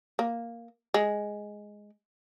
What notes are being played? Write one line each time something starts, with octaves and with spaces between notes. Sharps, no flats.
A#3
G#3